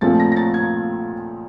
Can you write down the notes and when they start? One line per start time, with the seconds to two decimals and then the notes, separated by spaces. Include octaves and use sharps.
0.01 A#2 F3 A3 C4 A6
0.20 A#6
0.32 A#6
0.36 A6
0.54 G#6